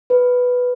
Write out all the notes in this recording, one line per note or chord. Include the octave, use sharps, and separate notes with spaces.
B4